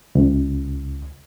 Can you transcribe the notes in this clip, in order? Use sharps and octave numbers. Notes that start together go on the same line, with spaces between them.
C#2